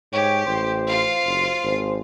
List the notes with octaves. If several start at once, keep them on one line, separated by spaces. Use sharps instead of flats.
G#2 G4 C#5
A1 C5
F4 F5
F#1
G#1